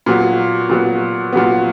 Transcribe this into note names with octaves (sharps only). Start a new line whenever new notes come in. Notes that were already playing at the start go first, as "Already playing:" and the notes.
A#2 F#3 B3
A#2 F#3 B3
A#2 F#3 B3